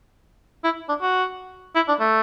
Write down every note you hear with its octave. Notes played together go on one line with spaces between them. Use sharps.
E4
D4
F#4
E4
D4
A3